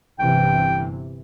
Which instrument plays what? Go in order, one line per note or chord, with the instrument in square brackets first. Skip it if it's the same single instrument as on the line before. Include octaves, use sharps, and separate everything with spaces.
[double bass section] G1 C3 E3 [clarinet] G5